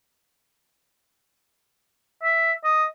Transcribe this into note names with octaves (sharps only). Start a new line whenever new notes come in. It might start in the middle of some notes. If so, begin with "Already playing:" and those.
E5
D#5